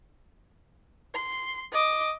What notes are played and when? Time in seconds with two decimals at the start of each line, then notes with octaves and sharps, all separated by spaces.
1.15 C6
1.72 D#5 D6